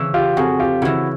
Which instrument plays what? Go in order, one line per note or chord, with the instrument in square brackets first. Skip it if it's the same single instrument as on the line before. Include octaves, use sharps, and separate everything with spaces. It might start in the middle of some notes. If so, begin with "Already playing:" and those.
Already playing: [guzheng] C#3 E3
[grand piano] F4 G4
[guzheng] F2 [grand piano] F#4 G#4
[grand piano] F4 G4
[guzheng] C#3 E3 [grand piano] E4 F#4